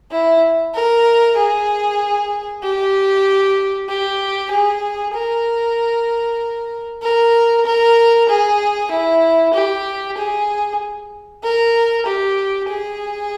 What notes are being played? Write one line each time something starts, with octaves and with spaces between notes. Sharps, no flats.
E4
A#4
G#4
G4
G4
G#4
A#4
A#4
A#4
G#4
E4
G4
G#4
A#4
G4
G#4